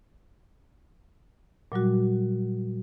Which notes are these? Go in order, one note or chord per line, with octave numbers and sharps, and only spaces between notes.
A#2 F#3 G3 F#4